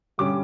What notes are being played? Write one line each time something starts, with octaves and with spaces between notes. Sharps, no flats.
G2 D3 G3 C#4 D6